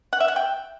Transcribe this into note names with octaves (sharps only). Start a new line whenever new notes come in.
F#5
E5
F#5
G5